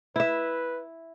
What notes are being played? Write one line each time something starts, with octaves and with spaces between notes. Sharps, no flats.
E4 B4 E5